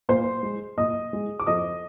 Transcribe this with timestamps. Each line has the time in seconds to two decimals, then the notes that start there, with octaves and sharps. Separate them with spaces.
0.09 A#2 C5 C6
0.43 G#3
0.77 A#2 D#5 D#6
1.13 G#3
1.40 D6
1.46 F2 D#5 D#6